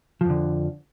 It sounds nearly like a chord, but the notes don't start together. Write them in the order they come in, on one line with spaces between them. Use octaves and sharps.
F3 F2 D3